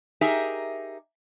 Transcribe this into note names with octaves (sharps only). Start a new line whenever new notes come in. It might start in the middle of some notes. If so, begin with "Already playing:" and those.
D#4 G4 G#4 A#4 E5